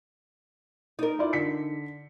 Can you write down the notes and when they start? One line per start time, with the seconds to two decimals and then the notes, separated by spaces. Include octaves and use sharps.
0.99 D#4 A#4
1.19 E4 F4 D5
1.33 D3 B6 C#7